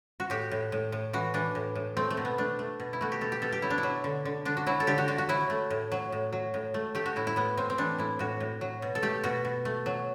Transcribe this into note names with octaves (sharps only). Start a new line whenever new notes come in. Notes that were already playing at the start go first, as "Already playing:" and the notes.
F#4
A2 G4
A2
A2
A2
E3 F#4
E3 D4
A2
A2
A3 C4
A3
B2
B3
A3 D4
A3
B2
E4
A3 F#4
G4
B2 A4
G4
B2 A4
G4
F#3 E4
D4
E4
F#3
D3
D3
D3 D4
F#4
F#3 E4
A4
D3 G4
F#4
D3 F#4
F#4
F#3 E4
A3
A2
F#3
A2
F#3
A2
A3
A3 G4
F#4
A2 E4
E4
A2 B3
A2 C4
C4
E3 D4
A2 E4
A2 F#4
A2
F#3
B2
A4
A3 G4
B2 F#4
B2
A3
F#3